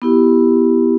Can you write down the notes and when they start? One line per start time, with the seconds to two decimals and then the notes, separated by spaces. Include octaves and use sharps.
0.02 B3 E4 G4